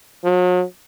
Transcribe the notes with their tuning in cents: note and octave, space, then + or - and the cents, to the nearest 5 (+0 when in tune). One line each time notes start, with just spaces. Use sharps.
F#3 -40